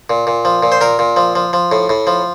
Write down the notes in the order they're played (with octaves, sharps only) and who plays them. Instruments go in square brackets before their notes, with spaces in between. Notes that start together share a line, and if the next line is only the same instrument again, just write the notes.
[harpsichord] A#2
A#2
F3
A#2
C5
A#2 A#4
A#2
F3
F3
F3
A2
A2
F3